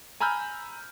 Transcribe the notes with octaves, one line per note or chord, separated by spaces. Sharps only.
G#5 A#5 B5 E6 F6 G6